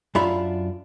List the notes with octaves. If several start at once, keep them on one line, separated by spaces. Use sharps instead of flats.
F#2 D4 F4 E5 B5